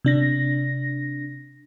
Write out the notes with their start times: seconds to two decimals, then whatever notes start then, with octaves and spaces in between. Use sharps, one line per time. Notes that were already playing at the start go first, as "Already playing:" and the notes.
0.05 C3 D4 A#6